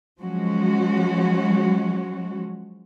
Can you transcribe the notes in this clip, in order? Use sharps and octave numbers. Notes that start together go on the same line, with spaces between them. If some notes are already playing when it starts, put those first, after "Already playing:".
F3 F#3 G#3 C#4 F#4